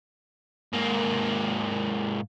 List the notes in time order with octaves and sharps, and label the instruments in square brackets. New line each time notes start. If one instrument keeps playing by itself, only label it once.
[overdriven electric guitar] G#2 A#3